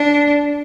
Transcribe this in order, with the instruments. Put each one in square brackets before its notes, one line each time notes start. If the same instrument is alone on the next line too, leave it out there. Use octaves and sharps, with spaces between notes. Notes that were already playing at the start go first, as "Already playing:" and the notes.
Already playing: [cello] D4